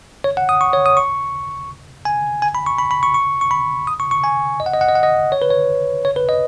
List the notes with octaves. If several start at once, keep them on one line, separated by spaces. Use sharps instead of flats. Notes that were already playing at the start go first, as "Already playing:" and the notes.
C#5
F#5
D#6
C#6
C#5
D#6
C#6
G#5
G#5
B5
C#6
B5
B5
C#6
C#6
C#6
B5
D#6
C#6
C#6
G#5
D#5
F#5
D#5
F#5
D#5
F#5
D#5
C#5
B4
C#5
C#5
B4
D#5